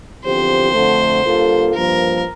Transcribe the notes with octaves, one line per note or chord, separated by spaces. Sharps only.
E2 D3 F3 C4 G4 C5
F2 D3 A3
D3 G3 A#3 F4 A4
G2 F3 A#3 A#4